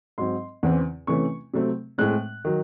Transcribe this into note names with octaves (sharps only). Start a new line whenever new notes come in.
G#2 F#3 C4 C6
E2 C#3 E3 C4
C3 E3 A3 C#4 C#6
C3 F#3 A3 C4
A2 G#3 C4 F#6
D#3 F#3